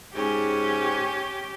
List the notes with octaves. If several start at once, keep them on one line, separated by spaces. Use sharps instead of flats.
G#2 C#4 G4